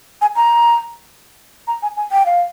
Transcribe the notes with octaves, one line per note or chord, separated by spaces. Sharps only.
G#5
A#5
A#5
G#5
G#5
G5
F5